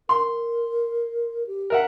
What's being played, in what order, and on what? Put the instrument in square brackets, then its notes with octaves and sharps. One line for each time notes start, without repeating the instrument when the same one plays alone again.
[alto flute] A#4 [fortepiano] C6
[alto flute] G4
[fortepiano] A#4 E5 F#5